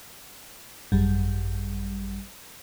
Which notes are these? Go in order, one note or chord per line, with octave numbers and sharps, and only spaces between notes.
G#1 F#2 G3